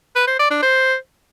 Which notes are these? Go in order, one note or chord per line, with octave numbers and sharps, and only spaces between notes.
B4
C5
D5
D4
C5